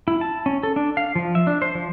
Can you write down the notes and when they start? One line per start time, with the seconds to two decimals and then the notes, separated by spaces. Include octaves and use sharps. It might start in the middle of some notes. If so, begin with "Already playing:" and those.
0.08 E4
0.21 A5
0.46 C#4
0.63 A4
0.76 D4
0.97 F5
1.15 F3
1.35 E5
1.47 D4
1.62 C5
1.75 F3